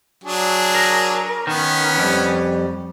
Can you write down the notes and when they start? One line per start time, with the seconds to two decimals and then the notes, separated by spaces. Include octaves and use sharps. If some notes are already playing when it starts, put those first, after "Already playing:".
0.24 F#3 D4 G#4
0.75 A#4
1.47 D#3 B3 C#4
1.98 F2 G3